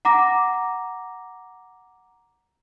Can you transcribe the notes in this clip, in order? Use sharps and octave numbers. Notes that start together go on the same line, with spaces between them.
F#5 A#5 D6 A#6